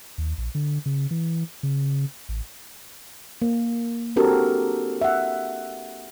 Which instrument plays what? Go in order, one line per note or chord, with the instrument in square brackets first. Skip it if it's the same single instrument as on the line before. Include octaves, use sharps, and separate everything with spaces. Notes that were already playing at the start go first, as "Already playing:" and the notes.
[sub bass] D#2
A#1
D3
C#3
E3
C#3
A1
[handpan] A#3
C4 D4 F#4 G4 A4 A#4
E5 F#5